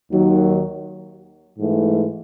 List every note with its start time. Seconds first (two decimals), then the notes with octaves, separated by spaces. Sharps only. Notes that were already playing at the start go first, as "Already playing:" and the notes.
0.12 D#2 D#3 F#3
1.57 G#2 E3 A3